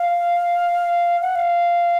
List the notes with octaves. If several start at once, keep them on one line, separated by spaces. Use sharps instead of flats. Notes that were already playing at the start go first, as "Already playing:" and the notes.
Already playing: F5
F#5
F5